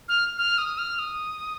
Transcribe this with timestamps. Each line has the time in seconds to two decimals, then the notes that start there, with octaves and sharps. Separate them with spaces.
0.08 F6
0.38 F6
0.58 D#6
0.78 F6
0.99 D#6